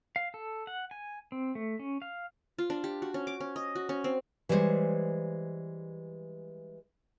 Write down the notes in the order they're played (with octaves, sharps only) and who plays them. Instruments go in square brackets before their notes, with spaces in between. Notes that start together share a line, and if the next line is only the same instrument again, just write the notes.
[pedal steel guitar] F5
A4
F#5
G#5
C4
A3
C#4
F5
[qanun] F4
D4
G4
F#4
C#4
D6
C#4
D#5
F#4
C#4
C4
[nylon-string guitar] E3 G3 G#3 G#4 C5 C#5